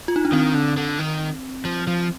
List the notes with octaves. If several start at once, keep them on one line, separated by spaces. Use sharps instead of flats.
F4
D#4
D4
D#3 C4
D3
D3
D#3
F3
F3